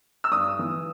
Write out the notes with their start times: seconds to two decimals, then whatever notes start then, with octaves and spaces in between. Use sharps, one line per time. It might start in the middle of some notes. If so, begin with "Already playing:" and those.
0.24 E6
0.31 G2 D#6
0.59 E3